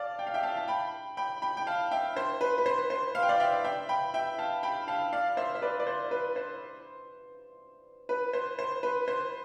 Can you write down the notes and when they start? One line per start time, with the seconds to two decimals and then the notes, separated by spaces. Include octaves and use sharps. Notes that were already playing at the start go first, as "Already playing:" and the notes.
Already playing: D5 F5 A5
0.19 G5
0.27 F5
0.34 E5 G5
0.43 F5 A5
0.57 A5
0.68 G5 B5
1.17 G5 B5
1.42 G5 B5
1.57 G5
1.67 F5 A5
1.91 E5 G5
2.17 C5
2.41 B4
2.58 B4
2.66 C5
2.90 C5
3.15 F5
3.22 G5
3.29 D5 F5
3.40 E5 G5
3.64 E5 G5
3.89 G5 B5
4.14 E5 G5
4.38 F5 A5
4.63 G5 B5
4.88 F5 A5
5.13 D5 F5
5.37 C5 E5
5.55 E5
5.62 B4 D5
5.80 D5
5.87 C5
6.11 B4
6.36 C5
8.09 B4
8.33 C5
8.59 C5
8.83 B4
9.08 C5